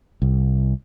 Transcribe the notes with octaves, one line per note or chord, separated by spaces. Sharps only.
C2